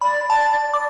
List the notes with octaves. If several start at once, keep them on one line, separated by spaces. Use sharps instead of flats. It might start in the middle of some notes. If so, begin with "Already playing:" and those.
D5 B5
D5 A5
D5 D6